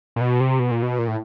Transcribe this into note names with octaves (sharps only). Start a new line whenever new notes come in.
A#2
B2
C3
B2
A#2
B2
A#2
A2